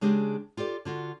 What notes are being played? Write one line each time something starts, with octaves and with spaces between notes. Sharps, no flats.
C#3 G#3 D4 G4 G#4
F4 G4 A4 D5
D3 F4 F#4